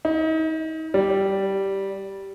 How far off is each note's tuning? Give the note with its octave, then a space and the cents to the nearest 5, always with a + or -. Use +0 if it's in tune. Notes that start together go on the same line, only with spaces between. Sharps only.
D#4 +35
G3 -10